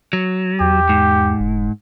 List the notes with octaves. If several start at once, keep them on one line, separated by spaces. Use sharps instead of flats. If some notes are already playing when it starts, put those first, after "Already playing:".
F#3
E2 G4
G#2
F1